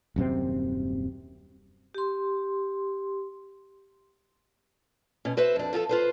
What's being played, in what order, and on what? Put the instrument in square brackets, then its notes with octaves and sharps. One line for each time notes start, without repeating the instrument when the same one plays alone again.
[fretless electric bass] D#1 F#2 C3 C4
[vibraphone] G4 C6
[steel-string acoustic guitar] B2 C#4
F#4 B4 C5 E5
F2 D4
F3 F4 G4 A4
F4 B4 C5